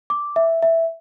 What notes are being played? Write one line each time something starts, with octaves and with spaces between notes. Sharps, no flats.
D6
E5
E5